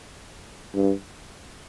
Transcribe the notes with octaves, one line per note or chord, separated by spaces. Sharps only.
G2